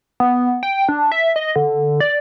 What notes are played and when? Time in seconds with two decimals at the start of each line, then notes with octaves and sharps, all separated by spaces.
0.20 B3
0.63 G5
0.89 D4
1.12 E5
1.36 D#5
1.56 D3
2.00 D5